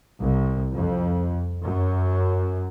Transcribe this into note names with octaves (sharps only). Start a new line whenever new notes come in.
C2
F2
F#2